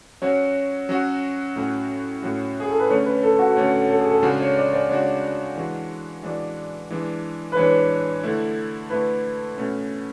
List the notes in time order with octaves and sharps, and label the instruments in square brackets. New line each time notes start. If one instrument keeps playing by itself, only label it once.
[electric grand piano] F#3 C#4 F#4 [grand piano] C#5
[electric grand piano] F#3 C#4 F#4
A2 F#3 C#4 F#4
A2 F#3 C#4 F#4
[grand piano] G#4
A4
B4
[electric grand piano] D3 A3 C#4 [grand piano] C#5
[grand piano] B4
A4
F#4
[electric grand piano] D3 A3 C#4 [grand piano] C#5
[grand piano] A4
G#4
A4
[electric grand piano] C#3 G#3 D4 F#4 [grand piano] C#5
[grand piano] C#5
D5
D5
[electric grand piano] C#3 G#3 D4 F#4 [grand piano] C#5
[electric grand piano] E3 G#3 D4 F#4
[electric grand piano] E3 G#3 D4 F#4 [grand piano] D5
[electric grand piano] E3 G#3 D4
[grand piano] B4
[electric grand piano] E3 G#3 D4 [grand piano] C#5
[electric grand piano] D3 A3 E4
[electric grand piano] D3 A3 E4 [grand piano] B4
[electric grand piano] B2 A3 C#4